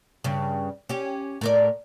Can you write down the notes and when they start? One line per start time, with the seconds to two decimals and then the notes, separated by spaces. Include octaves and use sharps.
0.24 G2 C#3
0.89 C#4 G4
1.41 A2 A#4 D5